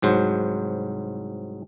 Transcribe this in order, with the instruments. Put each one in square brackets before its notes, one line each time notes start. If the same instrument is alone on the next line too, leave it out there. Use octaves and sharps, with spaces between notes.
[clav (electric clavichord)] C2 G#2 F#3 C5